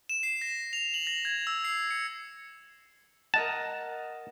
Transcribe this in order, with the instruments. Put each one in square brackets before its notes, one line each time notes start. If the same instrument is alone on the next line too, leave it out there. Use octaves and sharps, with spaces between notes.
[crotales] E7
C7
A#6
F7
F#7
A#6
G#6
E6
C7
C#7
[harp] A#4 D#5 F#5 [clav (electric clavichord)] A5